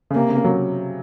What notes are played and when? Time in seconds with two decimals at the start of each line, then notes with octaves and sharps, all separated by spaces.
0.10 C#3
0.15 C3 A#3
0.29 C#3
0.44 F#3